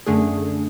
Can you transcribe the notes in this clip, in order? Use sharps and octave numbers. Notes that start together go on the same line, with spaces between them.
F#2 D3 A3 D4 G#4